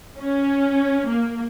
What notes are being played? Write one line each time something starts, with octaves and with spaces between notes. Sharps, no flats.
C#4
A#3